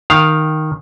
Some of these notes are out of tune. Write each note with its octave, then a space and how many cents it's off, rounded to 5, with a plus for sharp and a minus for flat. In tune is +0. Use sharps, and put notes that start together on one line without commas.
D#3 +0 F5 +0